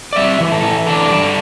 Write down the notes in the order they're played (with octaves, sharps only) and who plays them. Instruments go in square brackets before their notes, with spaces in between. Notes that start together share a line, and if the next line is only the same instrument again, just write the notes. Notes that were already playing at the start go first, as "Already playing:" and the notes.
[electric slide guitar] D5
G3 E5
E3
A4
E3
D4 A4
G3
A4